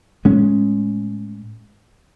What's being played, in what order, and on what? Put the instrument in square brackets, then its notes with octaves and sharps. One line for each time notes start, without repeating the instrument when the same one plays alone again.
[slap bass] A2 G#3 C#4